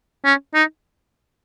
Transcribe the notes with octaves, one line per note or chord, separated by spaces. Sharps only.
C#4
D#4